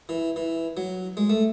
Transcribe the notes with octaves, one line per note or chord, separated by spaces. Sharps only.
E3
E3
F#3
G#3
A3